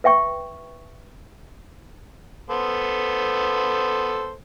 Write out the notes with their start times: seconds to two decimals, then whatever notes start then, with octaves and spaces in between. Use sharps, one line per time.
0.04 B4 E5 G5 C#6
2.50 B3 A4 C5